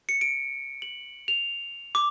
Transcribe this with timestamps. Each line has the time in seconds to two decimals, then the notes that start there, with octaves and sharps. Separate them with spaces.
0.09 C#7
0.21 D7
0.82 F#7
1.28 F7
1.95 D6